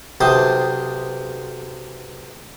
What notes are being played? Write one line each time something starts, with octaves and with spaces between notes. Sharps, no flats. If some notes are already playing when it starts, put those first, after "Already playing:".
B1 C3 C5 A5 D#6